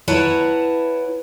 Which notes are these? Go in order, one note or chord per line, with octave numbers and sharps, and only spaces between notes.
E4 B4 C#5 F#5 A5 A#5